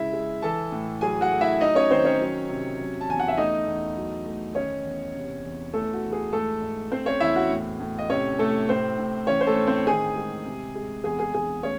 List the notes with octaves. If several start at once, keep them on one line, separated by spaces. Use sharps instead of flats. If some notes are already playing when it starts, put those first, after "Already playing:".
Already playing: C#3 G#3 E4 E5
G#3
E3 A4 A5
A2
F#3 G#4 G#5
F#4 F#5
A3
E4 E5
F#3 D#4 D#5
C#4 C#5
D#3 C4 C5
C#4 C#5
F#3
C3
F#3
A5
E2 G#5
F#5
E5
A3 D#4 D#5
E2
F#3
A3
D#3 C#4 C#5
E2
C3
E2
E3 A3 A4
F#4
E3
G#4
G#2 A3 A4
G#2
A3 C4 C5
C#4 C#5
E2 E4 E5
F#4 F#5
A2
A2
D#5
C3 C#4 C#5
C3 A3 A4
A2 C4 C5
A2
E3 C#4 C#5
C5
A3 A4
A2
C4 C5
D#3 G#4 G#5
G#3
C3
G#3
E2 G#4 G#5
G#4 G#5
E2 G#4 G#5
A3 C#4 C#5